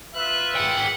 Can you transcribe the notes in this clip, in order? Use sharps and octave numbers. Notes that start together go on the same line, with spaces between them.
F4 B4 E5 F#6
G#4 F#5 G5